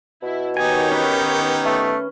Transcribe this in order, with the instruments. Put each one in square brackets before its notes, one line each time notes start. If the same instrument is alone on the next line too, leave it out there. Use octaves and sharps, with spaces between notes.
[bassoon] B2 [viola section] E4
[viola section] D#3 C#5 [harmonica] B3 D#4 G4 [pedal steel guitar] G#5
[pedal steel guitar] C#4 B4
[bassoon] A3